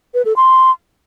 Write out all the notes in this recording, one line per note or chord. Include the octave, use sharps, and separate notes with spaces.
B4
A4
C6